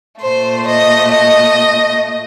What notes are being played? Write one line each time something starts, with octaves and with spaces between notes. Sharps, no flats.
A#2 A3 C5
D#5
D#5